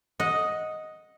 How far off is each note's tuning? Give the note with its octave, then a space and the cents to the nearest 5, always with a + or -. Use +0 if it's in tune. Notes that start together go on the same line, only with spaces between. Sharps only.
D#5 +5 F#5 -15